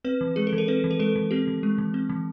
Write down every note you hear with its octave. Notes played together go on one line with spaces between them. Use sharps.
C4 B4
E3
G#3 G#4
A4
E3
A#4
C4 B4
E3
A#4
G#3 A4
E3
C4 G4
E3
G#3
E3
C4
E3